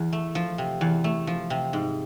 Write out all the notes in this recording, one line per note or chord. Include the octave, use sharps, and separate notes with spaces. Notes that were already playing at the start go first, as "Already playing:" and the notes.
Already playing: E2
A3
F3
C3
E2
A3
F3
C3
G#2